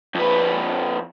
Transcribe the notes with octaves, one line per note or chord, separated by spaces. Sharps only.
F2 B4